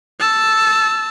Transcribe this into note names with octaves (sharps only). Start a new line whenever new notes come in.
A5 E6